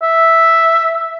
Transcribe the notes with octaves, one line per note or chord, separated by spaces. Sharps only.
E5